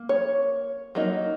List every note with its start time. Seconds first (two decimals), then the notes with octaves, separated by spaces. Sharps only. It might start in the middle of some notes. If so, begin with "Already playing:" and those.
Already playing: A#3
0.09 C#5
0.95 F#3 A#3 D#4